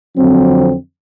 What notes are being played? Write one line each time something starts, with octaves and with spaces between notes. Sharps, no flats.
F2 D3 F#3 C4